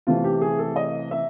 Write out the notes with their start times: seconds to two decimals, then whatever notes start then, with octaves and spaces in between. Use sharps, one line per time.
0.07 C3 E3 A3 F4
0.24 G4
0.41 G#4
0.59 A4
0.76 D#5
1.11 E5